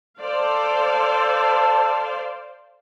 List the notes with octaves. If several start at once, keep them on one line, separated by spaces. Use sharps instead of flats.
A4 C5 D5 F5